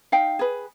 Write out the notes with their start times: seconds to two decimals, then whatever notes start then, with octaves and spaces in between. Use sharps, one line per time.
0.12 D#4 F5 G5
0.39 G#4 B4